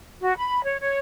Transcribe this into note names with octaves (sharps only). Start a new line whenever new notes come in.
F#4
B5
C#5
C#5